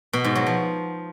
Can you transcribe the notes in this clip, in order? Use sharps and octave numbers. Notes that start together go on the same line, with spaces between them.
B2
G#2
F#3
F3